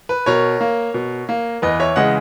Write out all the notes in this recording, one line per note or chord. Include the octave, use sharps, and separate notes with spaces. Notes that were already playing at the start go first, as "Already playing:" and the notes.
B4
B2 A#4 C#5
A#3
B2
A#3
E2 B4 D#5
C#5 E5
C#3 E3 G#3 D#5 F#5